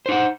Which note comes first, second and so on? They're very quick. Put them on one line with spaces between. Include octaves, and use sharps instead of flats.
C5 D#4 F#5